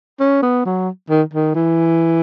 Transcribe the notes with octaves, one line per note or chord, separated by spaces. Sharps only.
C#4
B3
F#3
D#3
D#3
E3